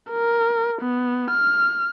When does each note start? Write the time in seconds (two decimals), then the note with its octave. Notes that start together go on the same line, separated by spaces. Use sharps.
0.11 A#4
0.81 B3
1.30 F6